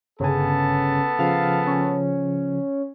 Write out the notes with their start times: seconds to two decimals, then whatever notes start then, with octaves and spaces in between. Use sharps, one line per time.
0.20 G1 C#3 B3 A4 G#5 A5
1.19 C#3 F3 F5
1.67 C#4